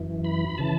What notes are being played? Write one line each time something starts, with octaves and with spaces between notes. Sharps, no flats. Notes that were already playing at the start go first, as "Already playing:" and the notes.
Already playing: F#2 E3
B5
C#3 E3 A5